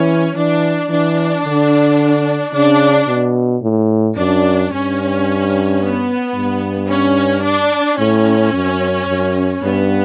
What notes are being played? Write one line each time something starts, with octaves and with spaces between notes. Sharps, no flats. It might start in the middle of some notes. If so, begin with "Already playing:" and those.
Already playing: E3 C#4
E3 D4
E3 D4
D3
C#3 D4
B2
A2
F#2 D4
G2 C#4
B3
G2
C#4
D4
A2 C#4
F#2
F#2
G2 B3